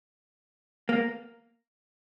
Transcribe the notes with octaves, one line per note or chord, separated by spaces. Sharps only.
A#3